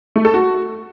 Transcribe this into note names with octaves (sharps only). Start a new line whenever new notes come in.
A3
A4
F#4